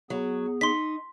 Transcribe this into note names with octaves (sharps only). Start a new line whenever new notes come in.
F#3 B3 G#4
D#4 C6 B6